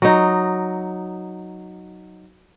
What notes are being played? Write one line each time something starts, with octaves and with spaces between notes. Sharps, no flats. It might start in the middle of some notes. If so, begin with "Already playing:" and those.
F#3 D#4